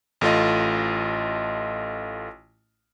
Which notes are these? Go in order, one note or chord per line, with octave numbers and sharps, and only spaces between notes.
A1 A3 F4 D#5